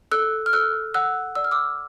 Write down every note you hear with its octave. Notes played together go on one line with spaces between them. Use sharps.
A4 E6 F#6
F6
A4 E6 F#6
F#5 E6 F#6
D5 E6
F6
D6 E6